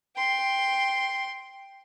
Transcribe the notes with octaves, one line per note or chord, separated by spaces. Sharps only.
G5 C6